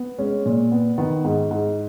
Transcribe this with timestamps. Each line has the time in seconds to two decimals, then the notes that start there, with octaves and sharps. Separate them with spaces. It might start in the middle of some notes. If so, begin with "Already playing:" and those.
Already playing: B3
0.18 G#3 C#4
0.46 A#2
0.72 B3
0.98 D#3 B3
1.25 G#2
1.51 G#2